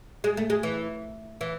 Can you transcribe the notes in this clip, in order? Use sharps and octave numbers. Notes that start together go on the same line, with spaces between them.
G#3
A3
G#3
E3
E3